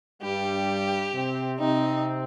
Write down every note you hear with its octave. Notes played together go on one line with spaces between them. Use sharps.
G2 G3 G4
C3 C4
C3 C4 D#4